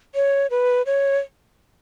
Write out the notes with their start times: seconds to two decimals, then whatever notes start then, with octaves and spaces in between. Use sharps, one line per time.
0.15 C#5
0.51 B4
0.86 C#5